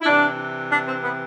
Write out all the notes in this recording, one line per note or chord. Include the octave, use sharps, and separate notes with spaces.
E4
C3 E3 D4
D4
C4
B3